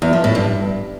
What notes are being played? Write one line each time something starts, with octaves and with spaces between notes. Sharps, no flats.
E2
F3
A2
G2